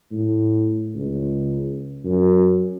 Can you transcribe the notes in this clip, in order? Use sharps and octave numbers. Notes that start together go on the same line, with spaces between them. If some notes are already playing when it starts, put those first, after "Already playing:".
A2
C#2
F#2